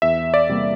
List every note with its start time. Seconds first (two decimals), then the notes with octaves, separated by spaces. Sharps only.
0.02 E2 E5
0.34 D5
0.49 C3 G3 A#3